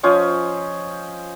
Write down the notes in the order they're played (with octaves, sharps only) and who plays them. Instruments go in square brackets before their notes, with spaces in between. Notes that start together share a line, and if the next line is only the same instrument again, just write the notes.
[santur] F3 C#4 C5 D#5